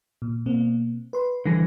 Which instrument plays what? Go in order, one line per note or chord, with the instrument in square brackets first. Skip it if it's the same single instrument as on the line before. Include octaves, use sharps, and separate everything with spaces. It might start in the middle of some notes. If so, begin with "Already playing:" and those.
[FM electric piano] A#2
B2 A#3 C4
B4 C6
[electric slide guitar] D3 E3 [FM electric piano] G3 A#6